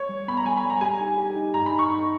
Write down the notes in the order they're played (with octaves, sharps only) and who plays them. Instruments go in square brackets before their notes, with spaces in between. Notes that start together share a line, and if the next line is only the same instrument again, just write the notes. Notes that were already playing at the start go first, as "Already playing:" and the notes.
Already playing: [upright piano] C#5
[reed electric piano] G3
[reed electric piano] B3 [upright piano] B5
[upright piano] A#5
[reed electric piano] G3 [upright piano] G#5
[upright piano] B5
[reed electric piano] G3
[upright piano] A#5
[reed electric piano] G4 [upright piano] G#5
[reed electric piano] D#4
G4
D#4
[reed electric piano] G2 [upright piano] A#5
[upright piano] B5
[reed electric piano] D#4
[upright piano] C#6
[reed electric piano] D#4